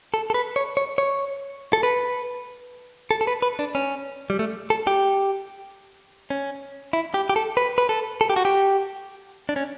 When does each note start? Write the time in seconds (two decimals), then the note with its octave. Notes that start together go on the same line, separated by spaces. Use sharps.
0.14 A4
0.30 A4
0.34 B4
0.56 C#5
0.77 C#5
0.98 C#5
1.73 A4
1.83 B4
3.11 A4
3.21 A4
3.27 B4
3.42 B4
3.59 D4
3.75 C#4
4.30 G3
4.39 A3
4.70 A4
4.87 G4
6.30 C#4
6.93 E4
7.14 G4
7.30 G4
7.36 A4
7.57 B4
7.78 B4
7.89 A4
8.21 A4
8.30 G4
8.36 F#4
8.45 G4
9.49 D4
9.56 C#4